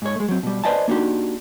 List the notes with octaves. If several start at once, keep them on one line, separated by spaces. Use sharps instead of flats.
G#2 C#5
G#3 A3
F#3 C4
B2 G3
B4 C5 D5 D#5 G#5 A5
A#3 D4 D#4 F#4 G4